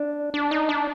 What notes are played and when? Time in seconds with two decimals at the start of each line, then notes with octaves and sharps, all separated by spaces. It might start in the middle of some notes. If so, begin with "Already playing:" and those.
Already playing: D4
0.34 D4
0.51 D#4
0.69 D4